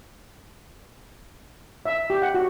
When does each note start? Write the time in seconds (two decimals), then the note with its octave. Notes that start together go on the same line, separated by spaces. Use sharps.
1.86 E5
2.10 G4
2.22 F#5
2.34 F#4